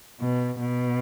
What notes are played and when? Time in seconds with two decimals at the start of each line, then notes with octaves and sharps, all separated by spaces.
0.21 B2
0.60 B2